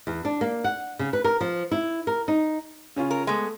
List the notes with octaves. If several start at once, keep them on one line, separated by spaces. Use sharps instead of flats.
E2
D4
A#3
F#5
C#3
B4
A#4
F3
E4
A#4
D#4
C#3 C#4 F4
A#4
G#3 A3 B3